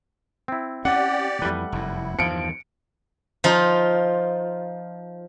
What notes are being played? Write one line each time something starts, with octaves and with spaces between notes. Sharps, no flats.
C4 E4
C#4 G4 D5 F#5
F2 E3 G3 A3 B4
F1 F#2 E4
E2 G2 D#3 F3 C#7 D7
F3 D#4 F4